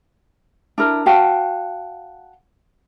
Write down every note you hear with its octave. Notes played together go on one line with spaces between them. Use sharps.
D4 E4 A#4
F#4 F5 G5 A5